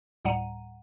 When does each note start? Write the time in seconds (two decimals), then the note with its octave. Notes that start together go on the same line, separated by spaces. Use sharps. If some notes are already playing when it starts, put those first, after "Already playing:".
0.25 D2 A2 G3 F#5 A#5 D#7